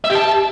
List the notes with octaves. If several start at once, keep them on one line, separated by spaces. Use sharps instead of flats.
E5
G4
A5